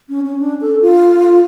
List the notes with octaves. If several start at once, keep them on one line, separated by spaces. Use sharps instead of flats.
C#4
C#4
D4
A4
F4